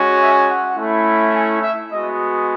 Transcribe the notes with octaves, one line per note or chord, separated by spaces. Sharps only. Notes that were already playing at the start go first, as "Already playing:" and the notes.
Already playing: G#3 C#4 F#4
E5
F#5
A3 C#4 E4
G#5
E5
G#3 B3 F#4 D#5